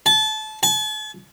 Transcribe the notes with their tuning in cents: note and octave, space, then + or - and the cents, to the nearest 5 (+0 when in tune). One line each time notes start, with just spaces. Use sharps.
A5 -25
A5 -45